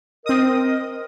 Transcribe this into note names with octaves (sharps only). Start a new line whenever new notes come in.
C4 A#4 D#5 D#6